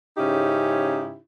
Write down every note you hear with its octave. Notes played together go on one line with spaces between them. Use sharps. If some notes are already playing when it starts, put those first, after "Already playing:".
G#2 C#3 C#4 D#4 E4 G4